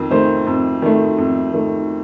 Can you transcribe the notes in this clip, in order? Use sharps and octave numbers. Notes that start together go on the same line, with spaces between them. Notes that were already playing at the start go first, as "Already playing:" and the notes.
Already playing: F2 D#3
D#3 A3 C5
F2
D#3 A3
F2
D#3 A3